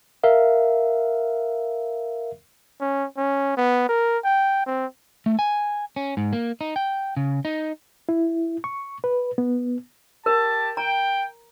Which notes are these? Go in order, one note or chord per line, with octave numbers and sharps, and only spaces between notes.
A#4 E5 F5
C#4
C#4
B3
A#4
G5
C4
A3
G#5
C#4
G#2
A#3
D#4
G5
C#3
D#4
E4
C#6
B4
B3
G4 A#4 A5
G5 A#5